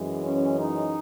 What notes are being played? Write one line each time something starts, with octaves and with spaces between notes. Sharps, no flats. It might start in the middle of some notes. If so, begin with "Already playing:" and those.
Already playing: F#2 E3 G#3
C#4
D#4